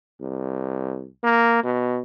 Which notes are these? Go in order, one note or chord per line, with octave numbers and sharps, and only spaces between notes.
C2
A#3
B2